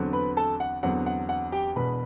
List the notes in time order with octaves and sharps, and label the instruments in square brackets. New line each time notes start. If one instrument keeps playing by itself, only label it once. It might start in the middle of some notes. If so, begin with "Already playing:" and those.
Already playing: [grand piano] E2 D3 F#3 C4
[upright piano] B4 B5
A4 A5
F#5
[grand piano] E2 D3 F#3 C4 [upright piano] F#5
[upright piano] F#5
F#5
G4 G5
[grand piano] E1 E2 B2 [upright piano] B4 B5